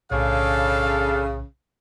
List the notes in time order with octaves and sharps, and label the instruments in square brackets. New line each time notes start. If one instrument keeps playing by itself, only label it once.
[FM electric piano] B1 A2 [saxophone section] C#3 [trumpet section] D4 A4 F5